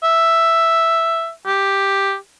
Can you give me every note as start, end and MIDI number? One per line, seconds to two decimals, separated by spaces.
0.04 1.30 76
1.47 2.15 67